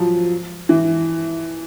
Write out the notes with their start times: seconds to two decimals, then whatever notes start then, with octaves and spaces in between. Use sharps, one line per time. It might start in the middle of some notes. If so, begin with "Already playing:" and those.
Already playing: F3 F#3
0.69 E3